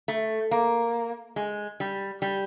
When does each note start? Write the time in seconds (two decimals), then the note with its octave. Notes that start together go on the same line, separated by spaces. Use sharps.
0.08 A3
0.51 A#3
1.36 G#3
1.80 G3
2.22 G3